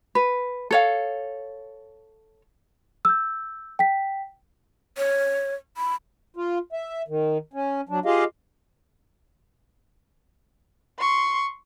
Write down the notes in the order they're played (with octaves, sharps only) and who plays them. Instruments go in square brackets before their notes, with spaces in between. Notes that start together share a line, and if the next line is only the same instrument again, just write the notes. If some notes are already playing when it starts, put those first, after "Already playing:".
[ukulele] B4
A4 C#5 F5
[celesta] E6 G6
G5 B6
[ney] C#5
B5
[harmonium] F4
E5
D#3
C#4
F#3 D4
F4 G4 G#4 D#5 F5
[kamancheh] C6 C#6